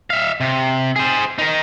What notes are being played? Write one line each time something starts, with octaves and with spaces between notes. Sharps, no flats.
E5 F5
C3
G#4 C5
D#4 A#4